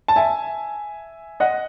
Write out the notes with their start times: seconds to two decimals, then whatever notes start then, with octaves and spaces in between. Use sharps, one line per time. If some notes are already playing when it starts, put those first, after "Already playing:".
0.08 A5
0.16 E5 G#5
1.40 D#5 F#5